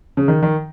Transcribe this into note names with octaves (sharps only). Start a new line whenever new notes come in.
C#3
D#3
D#3